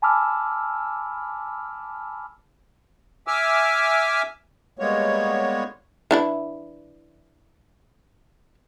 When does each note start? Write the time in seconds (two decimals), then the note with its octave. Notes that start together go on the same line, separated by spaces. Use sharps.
0.02 G#5 A5 B5 D6 E6 F6
3.27 E5 G#5 D6 E6 F6
4.79 G3 G#3 A#3 B3 C#5
6.11 E3 D4 E4